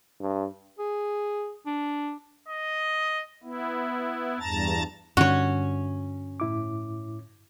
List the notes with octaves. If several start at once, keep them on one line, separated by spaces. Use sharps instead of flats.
G2
G#4
D4
D#5
B3 E4
E2 G2 A5 A#5 A6
G2 D3 C#4 F#4 C#5
A2 E4 D6